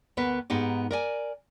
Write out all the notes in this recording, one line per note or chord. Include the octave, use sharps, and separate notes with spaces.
D2 B3 A#4 B4
G#2 B3 D#4 G4
A#4 D5 G#5